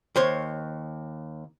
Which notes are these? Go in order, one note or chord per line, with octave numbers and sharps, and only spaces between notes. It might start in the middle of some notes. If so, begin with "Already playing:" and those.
D#2 C5 C#5